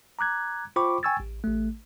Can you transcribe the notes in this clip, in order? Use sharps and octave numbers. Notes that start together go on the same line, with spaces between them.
A#5 D6 F#6 G#6
F4 C5 G5 B5 C#6 D6
G5 G#5 C#6 E6 G#6 A6
A1
A1 A3